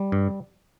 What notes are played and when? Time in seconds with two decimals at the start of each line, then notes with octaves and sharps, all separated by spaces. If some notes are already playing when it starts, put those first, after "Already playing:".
Already playing: G3
0.12 G2